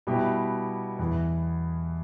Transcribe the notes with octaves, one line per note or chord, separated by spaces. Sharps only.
B2 G3 B3 E4 G4
E2 E3 B3